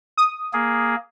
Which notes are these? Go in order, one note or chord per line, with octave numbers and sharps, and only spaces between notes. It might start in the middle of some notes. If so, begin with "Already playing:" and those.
D#6
A#3 G#4